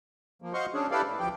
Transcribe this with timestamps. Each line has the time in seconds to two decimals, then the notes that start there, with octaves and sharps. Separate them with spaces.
0.42 F3 A#3
0.54 F#4 C5 D#5 F5 C6 C#6
0.74 C#4 D4 G#4
0.91 E4 G4 A4 B4 D5 F5
1.07 A2
1.19 D2 F3 G4 G5